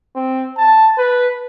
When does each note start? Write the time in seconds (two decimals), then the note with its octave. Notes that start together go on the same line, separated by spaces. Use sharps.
0.15 C4
0.58 A5
0.98 B4